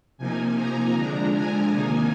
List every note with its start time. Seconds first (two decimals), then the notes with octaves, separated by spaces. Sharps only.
0.18 C3 F3 A#3 D#4 G#5
0.56 A#5
0.94 D3 F3 G#3 D4 A#5
1.32 G#5
1.69 C3 D#3 A#3 D#4